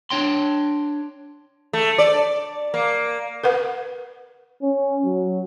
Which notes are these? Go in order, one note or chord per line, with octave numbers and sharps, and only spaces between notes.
D4 C#5 G5 C6
A3
D5
A#3
A#4 B4 F#5
C#4
F#3